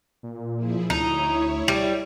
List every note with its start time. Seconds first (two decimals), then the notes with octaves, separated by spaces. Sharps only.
0.23 A#2
0.56 F3 E4 G#4
0.90 D2 D#4 E4 C#5
1.68 G3